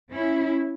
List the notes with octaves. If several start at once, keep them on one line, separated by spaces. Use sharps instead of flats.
C#4 E4